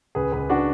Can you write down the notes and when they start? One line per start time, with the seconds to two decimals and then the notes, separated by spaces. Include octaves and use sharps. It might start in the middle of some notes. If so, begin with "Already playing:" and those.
0.15 C#2 G#4 B4
0.32 C#2 G#4 B4
0.50 D4 F#4